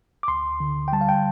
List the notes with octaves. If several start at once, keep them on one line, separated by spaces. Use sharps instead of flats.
D6
D2 C6
D3
G5
G3 A5
F5
G5